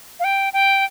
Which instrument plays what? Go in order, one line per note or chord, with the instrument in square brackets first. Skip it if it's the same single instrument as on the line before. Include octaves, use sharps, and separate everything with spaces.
[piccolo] F5
G5
G5